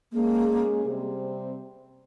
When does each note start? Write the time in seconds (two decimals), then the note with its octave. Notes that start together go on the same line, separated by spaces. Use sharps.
0.12 G#3 A#3 C#4 G#4
0.85 C3 G3 C4